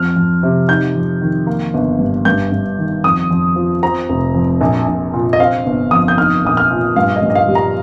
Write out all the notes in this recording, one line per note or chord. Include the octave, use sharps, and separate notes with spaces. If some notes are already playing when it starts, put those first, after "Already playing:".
Already playing: F2 F6
F2
C3
D#4 G6
F2
D#3
A#3
G1
G2
G2 G6
G2
D#3
F2 D#6
F2
F3
C4 A#5
F1
F2
A#1
A#1
A#2
D#5
C4 F5
G1
F2 D#6
G6
D#4 F6
A#1 D#6
F6
A#2
G2 F5
D#5
G2
D#5
F5
G3
A#5